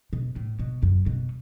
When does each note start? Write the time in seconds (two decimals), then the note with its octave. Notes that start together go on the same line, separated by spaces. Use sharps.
0.13 B2
0.36 A2
0.59 B2
0.83 F#2
1.06 B2